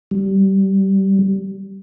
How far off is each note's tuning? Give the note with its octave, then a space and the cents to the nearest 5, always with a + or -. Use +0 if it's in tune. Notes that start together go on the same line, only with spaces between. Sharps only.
G3 -20